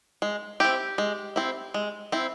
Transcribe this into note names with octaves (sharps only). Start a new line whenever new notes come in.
G#3
C4 E4 G4
G#3
C4 E4
G#3
C4 E4